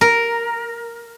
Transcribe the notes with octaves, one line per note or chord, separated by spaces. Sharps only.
A#4